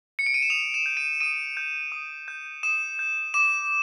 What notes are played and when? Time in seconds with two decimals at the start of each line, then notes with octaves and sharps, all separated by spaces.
0.19 C#7
0.26 D7
0.34 D#7
0.42 E7
0.50 D#6 F7
0.74 E7
0.86 G6
0.97 D#7
1.21 D#6 D#7
1.57 G6
1.92 D#6
2.28 G6
2.63 D#6 E7
2.99 G6
3.34 D6 E7